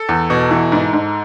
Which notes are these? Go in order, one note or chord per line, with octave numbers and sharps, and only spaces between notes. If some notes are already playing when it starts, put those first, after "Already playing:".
Already playing: A4
E2
B2
E3
G#2
G#2